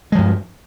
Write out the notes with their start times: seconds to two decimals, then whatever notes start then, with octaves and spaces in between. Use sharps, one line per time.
0.12 G#3
0.15 F3
0.18 G2